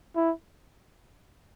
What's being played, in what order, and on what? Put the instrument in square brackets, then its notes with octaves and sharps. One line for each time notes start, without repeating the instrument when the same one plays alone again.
[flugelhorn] E4